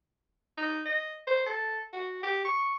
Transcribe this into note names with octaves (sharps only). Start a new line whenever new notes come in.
D#4
D#5
C5
A4
F#4
G4
C#6